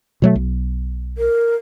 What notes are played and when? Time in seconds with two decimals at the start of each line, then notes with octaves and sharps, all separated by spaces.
0.22 B2 F#3 A3
0.36 B1
1.18 A#4